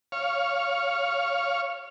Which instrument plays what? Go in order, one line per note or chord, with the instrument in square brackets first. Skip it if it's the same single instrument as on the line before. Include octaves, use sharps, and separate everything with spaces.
[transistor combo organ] C#5 F5